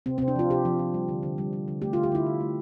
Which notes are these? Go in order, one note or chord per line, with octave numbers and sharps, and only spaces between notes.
C3 C4
C3 C4
D4
F3 F4
C3 G4
F3
F3
G3
D3
D3
G3
G3
D3
A3 G4
D3 F4
G4
D3 E4
D3
A3